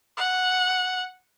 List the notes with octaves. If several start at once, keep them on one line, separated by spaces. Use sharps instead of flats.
F#5